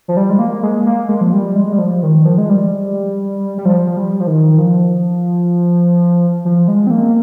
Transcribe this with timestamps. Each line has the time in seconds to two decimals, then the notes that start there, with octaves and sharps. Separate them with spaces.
0.08 F3
0.17 G3
0.30 G#3
0.39 A#3
0.63 G#3
0.86 A#3
1.09 G#3
1.21 F3
1.33 G3
1.56 G#3
1.73 G3
1.79 F3
2.03 D#3
2.25 F3
2.38 G#3
2.49 G3
3.58 G3
3.65 F3
3.87 F3
3.97 G3
4.20 F3
4.27 D#3
4.58 F3
6.45 F3
6.68 G#3
6.87 C4
6.91 A#3